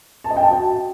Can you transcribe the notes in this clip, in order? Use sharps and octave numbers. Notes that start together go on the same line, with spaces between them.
A5
D#5
G5
A5
F#4